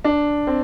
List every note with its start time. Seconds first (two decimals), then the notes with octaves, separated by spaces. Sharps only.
0.04 D4
0.47 C4